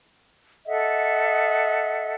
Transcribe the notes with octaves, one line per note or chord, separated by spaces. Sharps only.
A4 D#5 E5 F#5